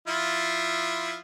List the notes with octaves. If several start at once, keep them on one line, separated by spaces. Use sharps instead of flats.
F3 E4 F4